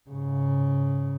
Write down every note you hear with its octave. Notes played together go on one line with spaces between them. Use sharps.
G#2 C#3